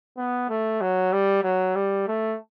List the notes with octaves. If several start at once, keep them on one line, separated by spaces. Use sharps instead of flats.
B3
A3
F#3
G3
F#3
G3
A3